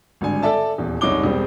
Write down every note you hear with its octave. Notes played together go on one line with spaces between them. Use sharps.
G#1 G2 D3 G#5
A4 D5 E5 A5
D#1 E2
F#1 C2 D#4 C#5 D6 G7
E1 G3 C4